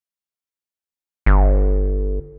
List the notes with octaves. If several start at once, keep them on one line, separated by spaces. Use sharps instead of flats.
G1